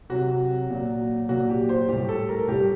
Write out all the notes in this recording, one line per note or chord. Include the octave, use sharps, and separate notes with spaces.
C3 F#3 F#4
A#2 F#3
A#2 F#3 F#4
G4
C5
A2 G3 G4
A4
A#4
A2 G3 G4